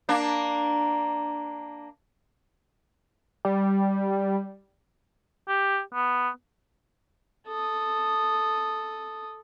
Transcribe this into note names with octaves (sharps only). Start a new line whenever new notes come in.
A#3 D4
G3
G4
B3
A4 D#6